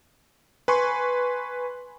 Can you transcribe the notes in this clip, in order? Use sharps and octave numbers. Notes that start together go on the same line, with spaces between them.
B4 G#5 C6 C#6